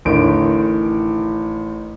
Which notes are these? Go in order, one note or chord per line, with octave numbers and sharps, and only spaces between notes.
A1 D3 D#3 D7